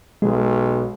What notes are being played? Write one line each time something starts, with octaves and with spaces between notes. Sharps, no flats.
B1 G#3